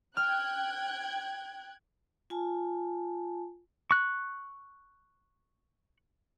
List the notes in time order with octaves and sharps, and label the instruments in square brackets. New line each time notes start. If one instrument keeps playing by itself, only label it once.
[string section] G5 F#6 G#6 [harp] F6
[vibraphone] F4 G#5 A5
[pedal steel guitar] C#6 F#6